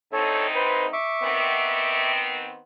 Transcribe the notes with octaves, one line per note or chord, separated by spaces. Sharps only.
D2 C4 D#4 A4 C#5
B4 C5
E5 C#6 D6
D#3 B3 C4